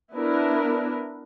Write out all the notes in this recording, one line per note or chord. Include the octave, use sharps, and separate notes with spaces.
B3 D4 E4 A#4 B4